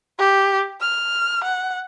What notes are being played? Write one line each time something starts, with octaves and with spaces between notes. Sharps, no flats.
G4
F6
F#5